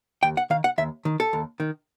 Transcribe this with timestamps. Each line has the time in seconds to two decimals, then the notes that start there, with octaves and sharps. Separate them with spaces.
0.23 D#2 G5
0.37 F#5
0.50 D#3 F5
0.64 F#5
0.78 D#2 E5
1.05 D#3
1.20 A4
1.33 D#2
1.60 D#3